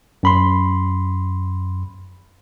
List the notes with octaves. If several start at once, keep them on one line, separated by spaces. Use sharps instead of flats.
F#2 B5 C6